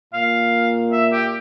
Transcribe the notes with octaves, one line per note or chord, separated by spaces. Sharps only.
A#2 F5
E5
G4